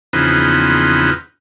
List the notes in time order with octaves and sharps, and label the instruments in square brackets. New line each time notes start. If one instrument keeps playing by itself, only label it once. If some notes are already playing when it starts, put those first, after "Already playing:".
[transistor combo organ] E2 C#3 F3 B3 C4 D#4